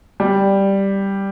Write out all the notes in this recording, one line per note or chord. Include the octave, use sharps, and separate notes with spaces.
G3